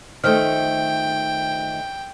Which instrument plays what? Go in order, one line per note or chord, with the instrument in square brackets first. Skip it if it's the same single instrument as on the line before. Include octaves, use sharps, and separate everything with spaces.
[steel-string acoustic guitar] D#3 F3 A3 [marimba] C5 F6 [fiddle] G5